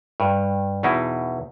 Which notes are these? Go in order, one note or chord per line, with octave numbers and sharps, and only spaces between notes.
G2
E2 B2 D#4 E4